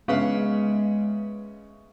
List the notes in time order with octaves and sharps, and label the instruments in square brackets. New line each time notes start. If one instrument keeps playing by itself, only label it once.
[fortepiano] C#3 F5 [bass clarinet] G#3 [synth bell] B3 B4 E5